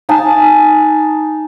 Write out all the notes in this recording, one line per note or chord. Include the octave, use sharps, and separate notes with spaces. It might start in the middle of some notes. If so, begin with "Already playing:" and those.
D#4 G#5 A5